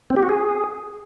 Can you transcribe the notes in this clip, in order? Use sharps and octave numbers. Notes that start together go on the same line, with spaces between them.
C4
G4
F#4
G#4